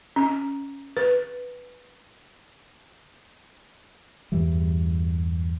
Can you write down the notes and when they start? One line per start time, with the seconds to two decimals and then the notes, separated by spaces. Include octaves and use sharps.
0.16 C#4
0.97 B4
4.32 E2 G2 E3 G3